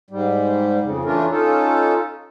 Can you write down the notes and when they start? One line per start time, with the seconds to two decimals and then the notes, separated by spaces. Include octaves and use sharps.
0.10 G#2 G3
0.84 F2 C#3
1.05 E3 A3 C#4 D4 F4 A#4
1.31 C#4 D#4 F4 A4